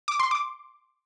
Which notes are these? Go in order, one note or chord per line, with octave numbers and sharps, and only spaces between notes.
D6
C6
D6